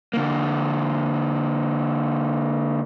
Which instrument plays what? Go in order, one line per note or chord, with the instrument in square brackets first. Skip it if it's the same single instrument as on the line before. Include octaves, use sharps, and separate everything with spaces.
[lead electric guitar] D3 A#3